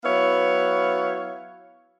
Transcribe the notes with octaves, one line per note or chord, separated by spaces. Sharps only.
F#3 B3 E4 C#5 F5